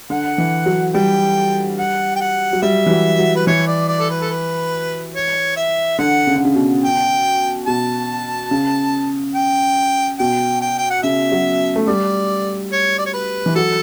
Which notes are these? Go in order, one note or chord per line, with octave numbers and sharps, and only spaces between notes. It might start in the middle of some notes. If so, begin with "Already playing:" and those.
D3 F#5
E3
F#3
G3 G5
F#5
G5
F#5
F#3
G3 E5
E3
F#3
F#3
B4
E3 C#5
D5
D5
A4
B4
A4
B4
C#5
E5
D3 F#5
C#3
D3
C#3
B2
G5
B2 A5
C#3
G5
B2 G5
G5
G5
F#5
C#3 E5
F#3
A3
G3 D5
C#5
D5
C#5
B4
E3
F#3 A4